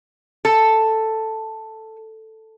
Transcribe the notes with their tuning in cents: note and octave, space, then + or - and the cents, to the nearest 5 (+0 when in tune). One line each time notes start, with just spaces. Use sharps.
A4 +5